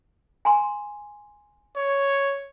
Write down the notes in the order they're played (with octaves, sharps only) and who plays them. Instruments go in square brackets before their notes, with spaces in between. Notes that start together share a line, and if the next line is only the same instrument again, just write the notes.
[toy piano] G#5 A#5 C6
[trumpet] C#5